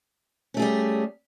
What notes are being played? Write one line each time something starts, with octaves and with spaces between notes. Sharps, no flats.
G3 A3 C#4 G#4